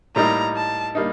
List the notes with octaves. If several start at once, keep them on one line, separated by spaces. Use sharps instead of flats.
A2 G3 A#3 D#4 A#5
A5
G3 A#3 D#4